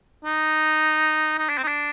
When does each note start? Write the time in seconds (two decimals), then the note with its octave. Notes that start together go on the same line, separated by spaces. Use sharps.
0.25 D#4
1.39 D#4
1.49 D4
1.58 C4
1.64 D#4
1.68 D4